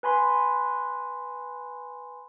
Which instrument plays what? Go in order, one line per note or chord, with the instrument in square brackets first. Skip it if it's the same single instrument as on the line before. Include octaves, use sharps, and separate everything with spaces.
[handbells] B4 G#5 B5 C6